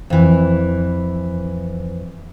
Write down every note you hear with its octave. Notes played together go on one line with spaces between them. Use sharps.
F2 E3